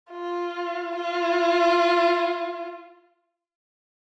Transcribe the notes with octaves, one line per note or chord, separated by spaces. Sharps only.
F4
F4